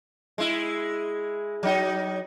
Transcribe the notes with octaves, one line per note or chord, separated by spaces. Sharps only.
G#3 E4
F#3 D#4